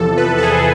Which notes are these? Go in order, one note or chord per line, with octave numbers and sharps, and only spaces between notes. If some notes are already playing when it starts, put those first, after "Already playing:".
Already playing: E2 C3 F3 A4
B4
A4
G#4